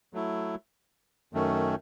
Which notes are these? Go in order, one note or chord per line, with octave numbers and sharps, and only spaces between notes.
F#3 A3 E4
F#2 D#3 A3 C#4